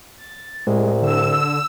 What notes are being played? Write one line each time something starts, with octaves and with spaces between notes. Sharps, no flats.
A6
C2 A2 G#3
D3 E6